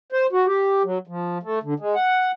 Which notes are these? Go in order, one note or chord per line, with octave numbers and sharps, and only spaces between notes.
C5
F#4
G4
F#3
F3
A3
D3
G#3
F#5